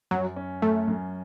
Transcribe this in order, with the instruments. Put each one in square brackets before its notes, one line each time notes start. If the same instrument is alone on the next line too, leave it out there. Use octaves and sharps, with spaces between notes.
[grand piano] F#2 [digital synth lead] F#3
[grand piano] C#4
[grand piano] F#2 [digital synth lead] A3
[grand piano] F#2